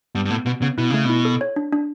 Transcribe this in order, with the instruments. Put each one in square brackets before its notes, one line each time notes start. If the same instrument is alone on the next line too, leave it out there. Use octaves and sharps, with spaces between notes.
[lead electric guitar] G2 [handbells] B3
[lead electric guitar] G2
[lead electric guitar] A2 [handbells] B3
[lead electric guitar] B2 [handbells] B3
[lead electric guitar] C#3 [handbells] B3
[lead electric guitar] B2 [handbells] E4
[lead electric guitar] C#3 [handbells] A3
[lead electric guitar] B2 [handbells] E4
[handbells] A4
C#5
D4
D4